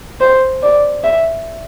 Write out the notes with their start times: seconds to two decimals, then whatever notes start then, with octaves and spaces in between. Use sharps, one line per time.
0.20 C5
0.62 D5
1.03 E5